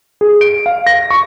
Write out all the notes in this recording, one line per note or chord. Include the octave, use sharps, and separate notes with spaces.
G#4
D7
F5
A#6
C#6